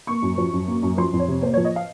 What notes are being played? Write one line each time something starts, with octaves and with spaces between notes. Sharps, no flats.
A#3 C#6
F#2
F3
F#2
A#3
F#2
F3 C6
F2
C#5
C3
A#3 C5
F3 C#5
D#5
F5